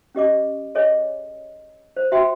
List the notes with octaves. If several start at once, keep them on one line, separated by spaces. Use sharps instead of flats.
C#4 G4 D#5 D6
G#4 A4 C#5 D#5 G#5
C5
F#4 E5 G5 B5 C6